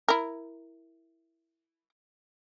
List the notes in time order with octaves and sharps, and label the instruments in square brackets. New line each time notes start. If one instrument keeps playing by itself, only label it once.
[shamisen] E4 A#4